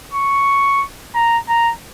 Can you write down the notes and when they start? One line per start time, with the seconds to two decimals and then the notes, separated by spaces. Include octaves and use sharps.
0.13 C#6
1.15 A#5
1.49 A#5